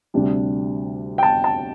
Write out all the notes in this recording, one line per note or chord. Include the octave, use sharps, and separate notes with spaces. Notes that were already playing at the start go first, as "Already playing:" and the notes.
D2 C3 G3 D4
G5
A5
A5